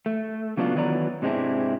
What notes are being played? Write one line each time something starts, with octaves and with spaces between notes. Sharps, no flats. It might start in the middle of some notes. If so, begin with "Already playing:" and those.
A3
C#3 F#3 B3 D4 E4 F4
D#3 E3 F#3 B3 D5 A#5
G#2 C3 G#3 C4 D4 E4